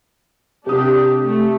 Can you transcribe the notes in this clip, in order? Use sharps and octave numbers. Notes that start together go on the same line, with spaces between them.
C3 D4 G4 D#6
A3